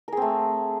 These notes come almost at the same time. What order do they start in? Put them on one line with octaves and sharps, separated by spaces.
A#4 G#4 C4 A3